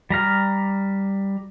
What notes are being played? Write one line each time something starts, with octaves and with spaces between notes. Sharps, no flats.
G3 A#5 F6